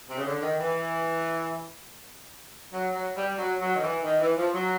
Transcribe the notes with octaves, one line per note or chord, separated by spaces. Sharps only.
C3
C#3
D3
D#3
E3
F#3
F#3
G3
F#3
F#3
D#3
E3
D#3
E3
F3
F#3